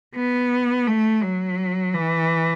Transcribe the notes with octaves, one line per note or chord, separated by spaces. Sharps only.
B3
A3
F#3
E3